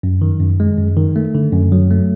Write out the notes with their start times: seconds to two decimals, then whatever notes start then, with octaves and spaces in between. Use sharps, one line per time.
0.03 F#2
0.22 D#3
0.40 F#2
0.60 G#3
0.78 F#2
0.97 D#3
1.16 A3
1.35 D3
1.53 F#2
1.72 F#3
1.91 A3